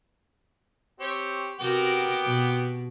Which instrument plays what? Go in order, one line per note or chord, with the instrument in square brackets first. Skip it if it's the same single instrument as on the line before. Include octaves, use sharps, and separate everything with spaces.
[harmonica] C4 G4 C#5
[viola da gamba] C3 F#4 A#4 [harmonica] B3 G5 D6
[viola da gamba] B2